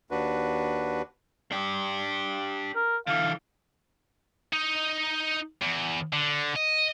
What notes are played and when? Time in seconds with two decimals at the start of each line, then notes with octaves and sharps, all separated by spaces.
0.11 D#2 D4 F#4 B4
1.52 D4 G4
2.76 A#4
3.07 D3 E3 F5
4.53 D#4
5.62 E2
6.13 D3
6.56 D#5